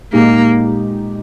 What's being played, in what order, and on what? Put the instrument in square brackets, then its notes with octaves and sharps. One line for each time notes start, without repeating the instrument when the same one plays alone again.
[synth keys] A#2 G#3 D#4 G4 [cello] A#3